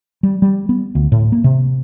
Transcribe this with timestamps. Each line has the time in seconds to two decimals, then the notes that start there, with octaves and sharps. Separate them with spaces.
0.23 G3
0.42 G3
0.69 B3
0.95 D2
1.12 A2
1.32 A#3
1.44 C3